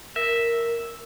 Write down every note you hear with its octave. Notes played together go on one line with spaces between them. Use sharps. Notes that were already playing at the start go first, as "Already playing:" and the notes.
A#4 E5